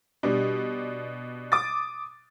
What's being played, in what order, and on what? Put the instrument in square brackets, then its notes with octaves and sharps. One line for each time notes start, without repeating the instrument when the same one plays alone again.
[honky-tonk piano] B2 G3 D4
D6 D#6 A6